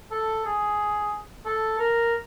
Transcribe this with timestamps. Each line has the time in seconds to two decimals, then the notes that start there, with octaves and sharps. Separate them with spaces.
0.11 A4
0.46 G#4
1.46 A4
1.79 A#4